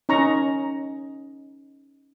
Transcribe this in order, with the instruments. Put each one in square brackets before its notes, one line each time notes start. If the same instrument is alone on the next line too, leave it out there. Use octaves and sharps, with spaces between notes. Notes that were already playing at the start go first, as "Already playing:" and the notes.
[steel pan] C#4 D#4 A#5 C#6